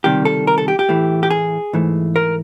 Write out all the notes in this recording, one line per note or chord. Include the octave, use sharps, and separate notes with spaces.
C#2 C3 D#3 G3 G4
A4
A#4
A4
G4
G4
A2 E3 A3
G4
G#4
G#2 E3 A3
A#4